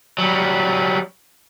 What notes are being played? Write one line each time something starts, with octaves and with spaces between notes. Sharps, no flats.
F#3 G3